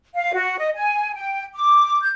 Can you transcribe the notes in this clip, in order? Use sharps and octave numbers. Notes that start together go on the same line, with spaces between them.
F5
F#4
D#5
G#5
G5
D6
G6